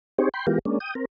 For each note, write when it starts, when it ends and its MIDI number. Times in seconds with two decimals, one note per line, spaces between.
0.18 0.29 60
0.18 0.29 63
0.18 0.29 67
0.18 0.29 68
0.18 0.29 72
0.18 0.29 73
0.34 0.46 79
0.34 0.46 83
0.34 0.46 84
0.47 0.59 52
0.47 0.59 56
0.47 0.59 59
0.47 0.59 65
0.47 0.59 67
0.47 0.59 70
0.65 0.79 56
0.65 0.79 58
0.65 0.79 61
0.65 0.79 62
0.80 0.94 79
0.80 0.94 87
0.95 1.05 60
0.95 1.05 70